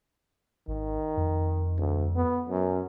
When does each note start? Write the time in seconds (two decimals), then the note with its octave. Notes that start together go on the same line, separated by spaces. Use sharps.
0.68 G#1 D#3
1.17 F2
1.78 D2
2.16 B3
2.49 F#2